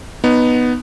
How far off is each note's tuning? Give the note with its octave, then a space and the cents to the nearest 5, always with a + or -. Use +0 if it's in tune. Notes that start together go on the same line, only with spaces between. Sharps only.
B3 +0 D#4 -10